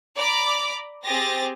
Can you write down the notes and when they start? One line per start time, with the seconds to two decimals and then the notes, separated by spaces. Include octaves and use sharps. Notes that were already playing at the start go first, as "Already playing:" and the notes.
0.16 D5 A#5 B5 D6
1.04 C4 G4 G#4 C5 A6 A#6